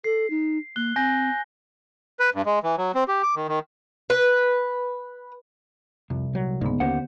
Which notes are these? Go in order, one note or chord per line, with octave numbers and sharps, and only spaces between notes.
A4 C7
D#4
A#3 F#6 G7
C4 G#5 G6 A#6
B4
G2
G#3
E3
F#3
C4
G4
D6
D#3
D#3
B4
C2 F2
A#2 F#3
C#2 G#2 D3 A#3 B3
D#2 A#3 C#4 G4 C5 F#5